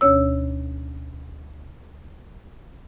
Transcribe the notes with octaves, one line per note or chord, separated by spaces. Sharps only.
D2 B2 C#4 C#5 E6